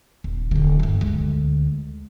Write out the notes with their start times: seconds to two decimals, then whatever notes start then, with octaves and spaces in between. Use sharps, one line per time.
0.24 D#1
0.51 D#1 D3
0.80 G2 D3
1.01 D2 G#3